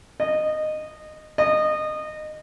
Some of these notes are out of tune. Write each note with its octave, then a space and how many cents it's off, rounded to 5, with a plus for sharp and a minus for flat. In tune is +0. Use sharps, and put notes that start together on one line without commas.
D#5 -15
D#5 -20